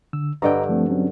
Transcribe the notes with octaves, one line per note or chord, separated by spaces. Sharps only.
D3 E6
G2 D3 B4 D#5 G5 A#5
F3 A3 C4
F#3 C4 C#4